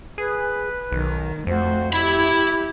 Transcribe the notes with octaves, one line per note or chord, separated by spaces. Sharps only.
G#4 B4
B1 D#3
F2 A3 F#4 C5
E4 G4 E5 B5 G#6